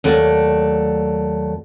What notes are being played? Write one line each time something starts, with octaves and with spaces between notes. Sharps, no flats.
D#2 F#3 A3 D5